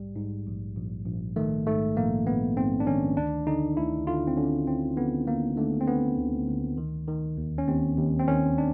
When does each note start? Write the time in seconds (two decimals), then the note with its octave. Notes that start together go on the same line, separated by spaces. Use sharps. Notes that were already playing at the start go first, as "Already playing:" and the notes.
Already playing: A#1 G#2 G3
0.16 G#2
0.46 A#1
0.77 A#1
1.06 A#1
1.36 D#3 A3
1.67 G#2 A3
1.96 A#1 A#3
2.27 A#1 B3
2.57 G#2 C4
2.80 D4
2.87 D#3 C#4
3.17 D2 D4
3.47 D3 D#4
3.77 D2 E4
4.07 D3 F4
4.28 C4
4.37 D3 C#4
4.67 D2 C4
4.97 D3 B3
5.27 D3 A#3
5.57 D3 A3
5.81 C4
5.87 D3 B3
6.17 D2
6.48 D2
6.78 D#3
7.08 D#3
7.37 D#2
7.58 C#4
7.68 D#2 C4
7.98 D#2
8.19 C4
8.28 D#3 C#4
8.58 D4